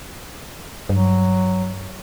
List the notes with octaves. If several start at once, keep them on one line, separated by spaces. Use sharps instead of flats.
G2 F#3